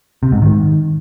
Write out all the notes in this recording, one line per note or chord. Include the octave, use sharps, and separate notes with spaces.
C3
G#2
D#3